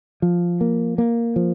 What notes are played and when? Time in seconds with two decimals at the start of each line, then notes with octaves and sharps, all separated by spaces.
0.22 F3
0.61 A#3
0.98 A#3
1.36 F3